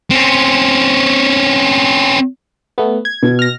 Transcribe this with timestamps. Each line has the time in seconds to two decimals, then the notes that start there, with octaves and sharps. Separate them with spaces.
0.11 C4 C#4
2.78 A3 B3
3.05 G#6
3.22 B2
3.39 F6 A#6